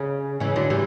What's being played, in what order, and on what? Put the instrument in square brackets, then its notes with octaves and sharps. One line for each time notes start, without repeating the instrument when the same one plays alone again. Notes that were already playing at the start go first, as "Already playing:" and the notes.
Already playing: [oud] C#3
C#3 E3
D3 F#3
E3 G3